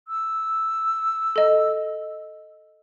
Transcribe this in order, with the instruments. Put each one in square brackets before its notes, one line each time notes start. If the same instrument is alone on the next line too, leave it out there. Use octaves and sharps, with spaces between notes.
[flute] E6
[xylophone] A4 D#5